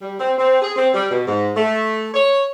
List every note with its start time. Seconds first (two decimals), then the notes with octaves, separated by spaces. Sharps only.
0.02 G3
0.20 C4
0.38 C4
0.62 G#4
0.76 C4
0.94 G3
1.11 B2
1.27 G#2
1.56 A3
2.14 C#5